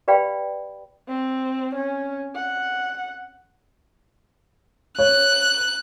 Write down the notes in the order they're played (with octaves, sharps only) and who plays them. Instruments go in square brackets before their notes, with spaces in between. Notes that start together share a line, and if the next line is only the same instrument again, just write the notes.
[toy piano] G4 B4 D5 F5 G5 B5
[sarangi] C4
C#4
F#5
[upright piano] C#5 [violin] F#6